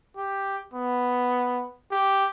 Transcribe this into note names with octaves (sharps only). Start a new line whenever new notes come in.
G4
B3
G4